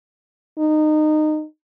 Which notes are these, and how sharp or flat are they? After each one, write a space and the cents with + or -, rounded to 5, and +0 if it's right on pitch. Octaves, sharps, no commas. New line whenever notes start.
D#4 -20